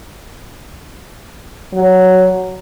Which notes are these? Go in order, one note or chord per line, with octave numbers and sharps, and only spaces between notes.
F#3